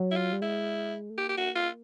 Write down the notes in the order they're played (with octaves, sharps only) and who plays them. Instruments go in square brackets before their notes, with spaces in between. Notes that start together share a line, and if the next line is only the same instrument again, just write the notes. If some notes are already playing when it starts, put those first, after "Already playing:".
Already playing: [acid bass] F#3
[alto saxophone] E4
F4
[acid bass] G3
[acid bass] G#3 [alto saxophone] E4
[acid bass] A3
[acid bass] A#3 [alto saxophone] G4
[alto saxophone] G4
F#4
F4